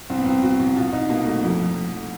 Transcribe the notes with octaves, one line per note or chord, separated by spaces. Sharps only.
C2 C4
B3
C2 C4
C2 F#4
C2
B2 F4
C2 D#4
B2 A#3
C2 A3
F2
F2
F2